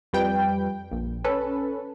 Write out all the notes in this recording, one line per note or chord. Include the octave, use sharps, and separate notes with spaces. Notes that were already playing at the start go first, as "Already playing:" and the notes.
F2 G3 B4 G5
A#1
C#4 A4 B4